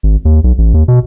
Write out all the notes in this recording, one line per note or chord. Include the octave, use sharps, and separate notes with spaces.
G#1
D#2
B1
A1
D#2
B2